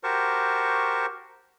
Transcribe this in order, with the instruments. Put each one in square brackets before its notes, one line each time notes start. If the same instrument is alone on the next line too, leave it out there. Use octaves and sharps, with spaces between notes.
[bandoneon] F#4 G4 A#4 C5 A5 C#6